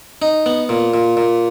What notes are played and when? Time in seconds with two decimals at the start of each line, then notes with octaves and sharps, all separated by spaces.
0.22 D#4
0.46 B3
0.69 A#2
0.94 A#2
1.17 A#2